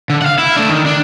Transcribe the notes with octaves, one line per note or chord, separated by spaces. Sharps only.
D3
F5 F#5
E4
A3 D4
D#3
D4